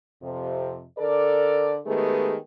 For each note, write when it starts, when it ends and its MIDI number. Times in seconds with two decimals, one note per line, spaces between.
0.23 0.84 41
0.23 0.84 48
0.99 1.78 50
0.99 1.78 69
0.99 1.78 70
0.99 1.78 74
1.87 2.36 51
1.87 2.36 56
1.87 2.36 57
1.87 2.36 59
1.87 2.36 67
1.87 2.36 68